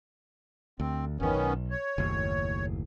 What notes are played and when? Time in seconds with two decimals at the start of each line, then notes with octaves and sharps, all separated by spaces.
0.80 D2 C4
1.20 G1 E2 D#3 B3 C#4
1.34 B1
1.71 C#5
1.98 F#1 D#2 A2